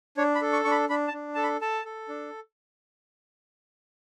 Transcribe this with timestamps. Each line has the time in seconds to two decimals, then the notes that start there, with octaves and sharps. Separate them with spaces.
0.17 D4 C#5
0.35 B5
0.42 A4
0.53 C#6
0.65 D4 C#6
0.71 B5
0.89 D4 B5
1.08 A5
1.13 D4
1.35 A4 A5
1.43 B5
1.61 A4 A5
1.85 A4
2.09 D4